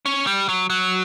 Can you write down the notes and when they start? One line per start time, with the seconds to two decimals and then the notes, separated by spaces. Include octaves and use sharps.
0.06 C#4
0.27 G3
0.49 F#3
0.70 F#3